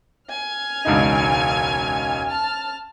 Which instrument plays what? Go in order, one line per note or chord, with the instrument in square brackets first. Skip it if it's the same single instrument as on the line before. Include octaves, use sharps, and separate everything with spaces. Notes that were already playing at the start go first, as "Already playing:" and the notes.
[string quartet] G#5 F6
[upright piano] E1 C#2 D#4
[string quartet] A5 F6